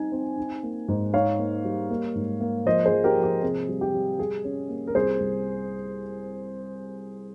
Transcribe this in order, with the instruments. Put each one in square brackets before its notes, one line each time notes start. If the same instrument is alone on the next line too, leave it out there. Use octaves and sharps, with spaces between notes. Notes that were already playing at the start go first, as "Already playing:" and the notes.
Already playing: [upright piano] G3 C4 D#4 G#5
C4
D#4
A#3
G#2
D#4 C#5 F5
A#3
G3
A#3
G#2
A#3
F3 C5 D#5
G#4 C5
F3
G4 A#4
F3
G4
C3 G#4
G3
G4
G3
G3 G#4
C#4
A#3
A#4
C2 G#4 C5
C2